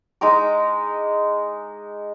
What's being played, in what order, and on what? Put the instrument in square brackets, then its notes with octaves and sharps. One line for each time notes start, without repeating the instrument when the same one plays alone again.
[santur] G#3 D#4 A#5 D6